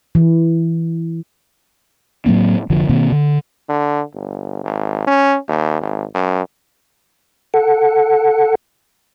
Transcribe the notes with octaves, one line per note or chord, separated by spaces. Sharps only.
E3
A2 F#3 A#3 C4
F1 D3 F3
B2 D#3 A#3 C4
D3
D3
G1
G#1
C#4
D#2
G#1
F#2
A4 F#5